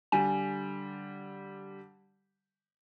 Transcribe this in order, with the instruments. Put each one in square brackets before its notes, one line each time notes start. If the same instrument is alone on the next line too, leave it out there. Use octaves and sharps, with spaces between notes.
[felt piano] D3 G3 [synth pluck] G#5